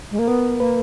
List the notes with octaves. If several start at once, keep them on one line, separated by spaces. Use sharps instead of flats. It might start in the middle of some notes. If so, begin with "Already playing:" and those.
G#3
A#3
B3 A#4
A#3 B4